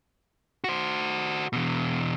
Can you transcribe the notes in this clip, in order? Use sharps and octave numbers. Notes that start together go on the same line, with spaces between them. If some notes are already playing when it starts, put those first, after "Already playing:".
F#4 C5
E2 B2